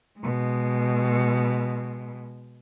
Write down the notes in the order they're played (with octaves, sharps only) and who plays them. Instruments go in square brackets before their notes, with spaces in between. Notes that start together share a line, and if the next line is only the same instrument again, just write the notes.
[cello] B2 G#3